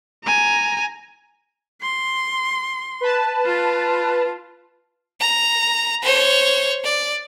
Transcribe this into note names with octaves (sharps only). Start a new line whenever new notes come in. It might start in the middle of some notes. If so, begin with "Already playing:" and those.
G#5 A#5
C6
B4 A5
F4
A#5
C5 C#5
D5